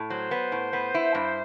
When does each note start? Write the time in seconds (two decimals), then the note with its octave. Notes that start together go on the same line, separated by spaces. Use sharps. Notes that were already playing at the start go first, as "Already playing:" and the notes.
Already playing: A2
0.10 F#3 C5
0.31 B3
0.52 A2
0.73 B3
0.94 E4
1.15 G2